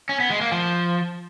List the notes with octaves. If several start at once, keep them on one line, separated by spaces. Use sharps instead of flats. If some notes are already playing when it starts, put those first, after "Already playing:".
C#4
B3
G#3
A#3
F3